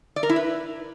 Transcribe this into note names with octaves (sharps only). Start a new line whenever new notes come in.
D5
A#4
E4
B4